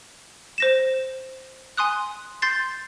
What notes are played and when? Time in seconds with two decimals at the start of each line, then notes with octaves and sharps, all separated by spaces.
0.58 C5 A#6 E7
1.77 G#5 C6 D#6 F#6
2.42 C6 G6 A6 C7